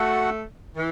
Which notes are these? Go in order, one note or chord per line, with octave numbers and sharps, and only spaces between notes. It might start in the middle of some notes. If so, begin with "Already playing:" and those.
Already playing: A3 F#4 A4 F#5
E3